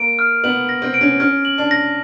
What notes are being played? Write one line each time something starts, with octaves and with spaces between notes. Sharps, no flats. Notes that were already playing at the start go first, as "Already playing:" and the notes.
Already playing: A#3 D7
F6
B3 F#7
A#6
C4
D7
C#4
C#4 F6
F#7
D4
A#6